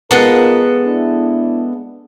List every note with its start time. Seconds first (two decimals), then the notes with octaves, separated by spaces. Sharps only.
0.11 G#3 B3 D#4 F4 A4 A#4
0.84 D4 E4